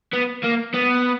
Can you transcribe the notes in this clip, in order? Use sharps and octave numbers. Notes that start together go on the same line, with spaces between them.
B3
A#3
B3